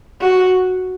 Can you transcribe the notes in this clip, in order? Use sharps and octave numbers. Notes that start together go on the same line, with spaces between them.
F#4